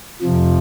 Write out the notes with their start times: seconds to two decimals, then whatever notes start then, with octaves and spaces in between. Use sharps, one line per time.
0.22 F2 C3 F3